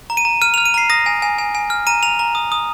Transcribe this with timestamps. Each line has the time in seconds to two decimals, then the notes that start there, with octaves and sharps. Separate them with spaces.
0.10 A#5
0.17 D#7
0.25 A#5
0.42 F6 D#7
0.54 F7
0.58 F6
0.66 D#7
0.74 A#5 C7
0.90 D#6 A#6
1.06 G#5
1.22 G#5
1.38 G#5
1.55 G#5
1.70 F6
1.87 A#5 D#7
2.03 A#5 F7
2.19 A#5
2.35 D#6
2.52 D#6